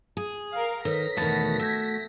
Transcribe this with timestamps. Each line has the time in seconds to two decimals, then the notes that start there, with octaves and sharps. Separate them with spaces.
0.17 G#4
0.53 A#4 F5 F6
0.85 D#3 A4 B4 C#5 A#6 B6
1.17 E2 B2 D#3 A3 F#4 A5
1.59 A4 E5 G6 G#6